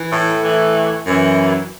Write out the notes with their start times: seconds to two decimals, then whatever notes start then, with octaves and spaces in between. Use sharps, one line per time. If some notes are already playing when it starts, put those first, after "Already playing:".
Already playing: E3
0.11 A2 A3
0.43 A2 E3
1.06 F#2 E3